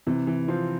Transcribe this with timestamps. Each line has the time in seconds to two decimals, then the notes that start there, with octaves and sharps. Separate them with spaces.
0.07 C3 E3
0.27 E3
0.48 F3 C4